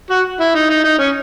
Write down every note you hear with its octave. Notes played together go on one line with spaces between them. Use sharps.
F#4
E4
D#4
D#4
D#4
C#4